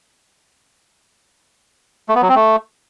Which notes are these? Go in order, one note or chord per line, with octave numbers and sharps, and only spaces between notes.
A3
B3
F#3
C4
A3